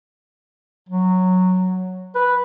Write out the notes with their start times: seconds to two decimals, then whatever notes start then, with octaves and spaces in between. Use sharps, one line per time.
0.89 F#3
2.15 B4